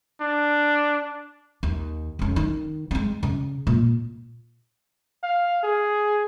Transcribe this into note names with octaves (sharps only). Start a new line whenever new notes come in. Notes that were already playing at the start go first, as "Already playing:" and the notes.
D4
D#2
F1 C#4
D#3
G#3 C4
C#3
A#2
F5
G#4